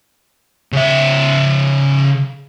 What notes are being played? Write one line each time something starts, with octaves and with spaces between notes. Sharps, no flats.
C#3 E5